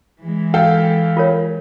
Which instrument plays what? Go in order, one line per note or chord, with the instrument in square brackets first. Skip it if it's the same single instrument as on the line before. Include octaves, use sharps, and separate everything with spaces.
[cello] E3 G#3
[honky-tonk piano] A4 F5 G5
[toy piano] F4 A#4 C#5